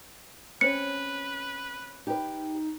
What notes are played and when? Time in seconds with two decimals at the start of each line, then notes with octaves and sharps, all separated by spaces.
0.61 C4 C#4 B4 C#7
2.07 D#4 G4 B4